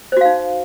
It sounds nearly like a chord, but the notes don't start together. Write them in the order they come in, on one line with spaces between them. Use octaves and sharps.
C5 F#4 F5 D#4